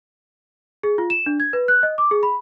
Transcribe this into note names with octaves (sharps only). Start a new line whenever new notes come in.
G#4
F4
E7
D4
G#6
B4
F#6
D#5
D6
G#4
B5